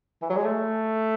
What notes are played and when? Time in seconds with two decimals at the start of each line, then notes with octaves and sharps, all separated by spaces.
0.22 E3
0.30 F#3
0.37 G#3
0.44 A3